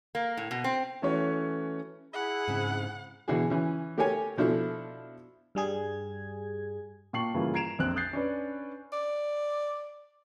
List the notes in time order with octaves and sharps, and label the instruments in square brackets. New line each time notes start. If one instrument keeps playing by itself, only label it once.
[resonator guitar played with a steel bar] A#3
A2
B2
C4
[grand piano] E3 A3 C#4 F#4 C#5
[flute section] E4 G#4 B5 [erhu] F#5
[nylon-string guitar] G#2 C#3 C4
[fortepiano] B2 D3 E3 D4 F#4 G#4
E3 C#4
A3 G4 A#4 C#5 G#5
B2 F3 D4 E4 A4
[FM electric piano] G2 G3 G#4 G#6
[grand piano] A#2 G5 A5 C#6 C7 F#7
G2 C#3 E3 A#3 E4 F4
A#5 G#6 C7 D7 E7 F7
A#1 F2 C4 F#6
D#6 F#6 G6 A6 C7
C#4 D4 B4
[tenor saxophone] D5